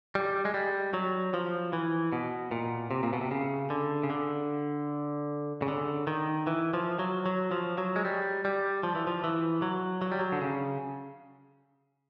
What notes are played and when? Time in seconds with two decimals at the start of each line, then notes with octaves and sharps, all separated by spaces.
0.15 G3
0.45 G#3
0.54 G3
0.94 F#3
1.34 F3
1.73 E3
2.12 B2
2.51 A#2
2.91 C3
3.03 A#2
3.13 B2
3.21 C3
3.31 C#3
3.70 D3
4.03 C#3
4.10 D3
5.62 C#3
5.68 D3
6.07 D#3
6.47 E3
6.74 F3
6.99 F#3
7.26 F#3
7.51 F3
7.78 F#3
7.96 G#3
8.05 G3
8.45 G3
8.83 F3
8.95 E3
9.07 F3
9.24 E3
9.62 F#3
10.02 F#3
10.12 G3
10.19 F#3
10.32 D3
10.41 C#3